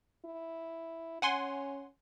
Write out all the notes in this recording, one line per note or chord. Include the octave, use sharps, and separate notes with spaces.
E4
C#4 F#5 G#5 C6